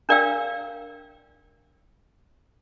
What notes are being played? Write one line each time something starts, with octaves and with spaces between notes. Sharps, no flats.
D4 A#4 D5 F5 G5 E6